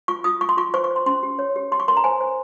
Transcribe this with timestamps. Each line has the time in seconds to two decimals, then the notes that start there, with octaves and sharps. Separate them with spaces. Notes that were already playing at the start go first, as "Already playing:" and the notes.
0.08 F4 C#6
0.24 F4 D#6
0.41 F4 C#6
0.49 C6
0.57 F4 C#6
0.74 C5 C#6
0.84 C#6
0.91 C5
0.96 C6
1.06 C#4 C6
1.23 G4
1.39 C#5
1.56 G4
1.72 G4 C6
1.80 C#6
1.88 A#4 C6
1.97 A#5
2.04 C5 G#5
2.21 C5